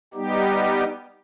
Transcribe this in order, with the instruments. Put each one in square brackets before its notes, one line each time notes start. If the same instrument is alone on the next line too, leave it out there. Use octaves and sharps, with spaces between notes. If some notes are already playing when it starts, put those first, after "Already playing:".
[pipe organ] G3 B3 D#4 G4